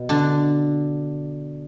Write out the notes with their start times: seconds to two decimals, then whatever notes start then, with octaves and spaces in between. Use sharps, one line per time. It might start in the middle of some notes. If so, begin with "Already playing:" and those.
Already playing: B2
0.09 D3 D4